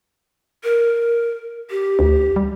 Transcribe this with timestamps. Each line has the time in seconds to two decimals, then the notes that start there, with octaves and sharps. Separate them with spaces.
0.64 A#4
1.70 G4
1.99 D2
2.36 G3